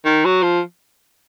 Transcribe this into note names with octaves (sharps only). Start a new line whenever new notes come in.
D#3
F#3
F3